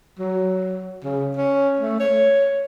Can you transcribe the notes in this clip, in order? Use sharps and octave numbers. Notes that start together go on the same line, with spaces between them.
F#3
C#3
C#4
A3
C#5